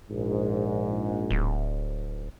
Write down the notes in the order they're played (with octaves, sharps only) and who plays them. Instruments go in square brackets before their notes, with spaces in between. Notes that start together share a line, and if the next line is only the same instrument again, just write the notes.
[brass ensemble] A#1 G#2
[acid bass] D1